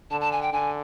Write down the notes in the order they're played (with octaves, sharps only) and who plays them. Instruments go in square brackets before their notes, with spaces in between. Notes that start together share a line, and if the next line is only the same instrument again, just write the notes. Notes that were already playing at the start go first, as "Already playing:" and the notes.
[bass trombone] D3 [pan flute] A5
[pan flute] A5
G#5
G5
[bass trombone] D3 [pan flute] G#5